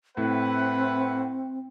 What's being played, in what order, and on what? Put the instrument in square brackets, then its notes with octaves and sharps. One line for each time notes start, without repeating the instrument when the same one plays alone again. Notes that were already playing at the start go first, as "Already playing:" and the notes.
[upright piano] A2 [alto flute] C4 [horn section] B4 E5 F#5